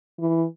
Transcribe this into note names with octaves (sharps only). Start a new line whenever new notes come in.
E3